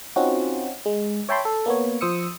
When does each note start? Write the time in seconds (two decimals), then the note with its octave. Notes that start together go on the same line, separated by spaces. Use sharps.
0.16 C4 C#4 D#4 F4 F#4
0.86 G#3
1.29 C#5 E5 G5 A5 B5 C6
1.45 A4
1.66 A#3 B3 C#5
2.01 F3 C5 D#6 E6 C#7